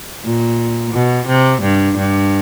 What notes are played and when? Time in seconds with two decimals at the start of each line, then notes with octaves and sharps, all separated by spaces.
0.24 A#2
0.94 B2
1.27 C3
1.62 G2
1.97 G2